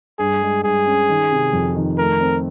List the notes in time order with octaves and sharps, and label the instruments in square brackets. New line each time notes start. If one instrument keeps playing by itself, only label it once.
[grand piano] G2 [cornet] G#4
[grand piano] G#3
[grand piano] G2 [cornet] G#4
[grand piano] C#4
D#3
C3
F2
D#3
[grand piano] A3 [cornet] A#4
[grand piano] C4